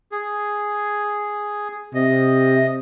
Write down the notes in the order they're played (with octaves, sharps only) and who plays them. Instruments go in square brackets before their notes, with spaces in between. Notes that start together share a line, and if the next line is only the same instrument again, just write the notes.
[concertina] G#4
[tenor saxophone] C3 [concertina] D#5